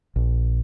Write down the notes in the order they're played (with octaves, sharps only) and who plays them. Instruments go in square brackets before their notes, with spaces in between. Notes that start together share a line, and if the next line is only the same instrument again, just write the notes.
[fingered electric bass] A#1